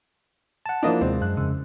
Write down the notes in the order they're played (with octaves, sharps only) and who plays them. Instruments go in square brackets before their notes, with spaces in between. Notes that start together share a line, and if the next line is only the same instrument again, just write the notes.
[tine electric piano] F#5 A5
[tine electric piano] F3 A#3 E4 [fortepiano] D4 D#5
[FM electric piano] D#2 C3 [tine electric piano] G#3 [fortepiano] C4
[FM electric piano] F#2 F#6
F2 C#3